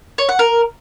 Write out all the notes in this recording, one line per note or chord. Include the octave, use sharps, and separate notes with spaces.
C#5
F#5
A#4